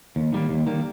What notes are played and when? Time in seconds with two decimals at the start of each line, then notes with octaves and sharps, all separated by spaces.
0.16 D#2
0.32 D#3 G3 A#3
0.49 D#2
0.66 D#3 G3 A#3